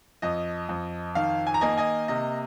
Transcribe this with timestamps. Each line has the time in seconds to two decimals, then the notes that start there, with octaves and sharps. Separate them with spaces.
0.22 F2 D#5
0.69 F2
1.15 D#3 F5
1.47 G#5
1.54 A#5
1.61 A#3 D#5 G#5
1.77 D#5 G#5
2.08 C3 D#5